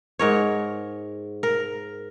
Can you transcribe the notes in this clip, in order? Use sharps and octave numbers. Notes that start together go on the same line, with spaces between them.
G#2 A#4 C#5
A#4